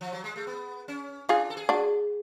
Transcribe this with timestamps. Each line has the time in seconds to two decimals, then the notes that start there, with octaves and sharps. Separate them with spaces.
0.01 F3
0.13 F#3
0.24 G#3
0.36 A3
0.47 B3
0.88 C#4
1.29 D4 F4 G#4
1.50 A4
1.57 G#4
1.69 D4 F#4